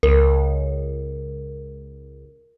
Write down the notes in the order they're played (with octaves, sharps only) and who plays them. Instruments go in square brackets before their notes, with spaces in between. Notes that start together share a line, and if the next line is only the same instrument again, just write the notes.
[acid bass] C#2 [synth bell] A#4